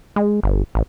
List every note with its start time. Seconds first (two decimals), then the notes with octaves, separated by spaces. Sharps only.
0.16 G#3
0.43 G1
0.75 A1